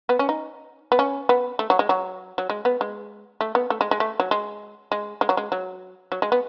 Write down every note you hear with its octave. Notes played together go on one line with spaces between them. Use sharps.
B3
C#4
D#4
B3
C#4
B3
A3
F#3
G#3
F#3
F#3
G#3
B3
G#3
A3
B3
A3
G#3
G#3
A3
F#3
G#3
G#3
G#3
F#3
G#3
F#3
F#3
G#3
B3